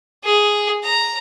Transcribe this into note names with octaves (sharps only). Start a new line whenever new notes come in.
G#4
A#5